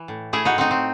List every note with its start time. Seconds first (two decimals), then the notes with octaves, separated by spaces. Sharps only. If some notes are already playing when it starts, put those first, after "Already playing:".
Already playing: E3
0.08 A2
0.33 A3 E4 G#4
0.45 D#4 F#4
0.56 A2 C4 D#4
0.71 C4